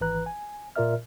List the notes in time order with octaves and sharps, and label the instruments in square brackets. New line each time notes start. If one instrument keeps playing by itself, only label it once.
[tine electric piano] G#1 E3 B4 A#5 F#6
G#5
A#2 F4 A#4 D5 E5 F6